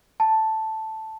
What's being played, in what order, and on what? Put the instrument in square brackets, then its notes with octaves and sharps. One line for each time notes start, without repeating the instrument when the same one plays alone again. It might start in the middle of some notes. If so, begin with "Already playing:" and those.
[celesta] A5